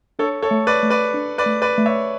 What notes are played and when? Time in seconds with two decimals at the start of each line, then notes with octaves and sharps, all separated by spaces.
0.19 D4 A4 C#5
0.42 A4 C#5
0.51 A3
0.67 B4 D5
0.83 A3
0.90 B4 D5
1.14 D4
1.38 B4 D5
1.46 A3
1.62 B4 D5
1.78 A3
1.86 C#5 E5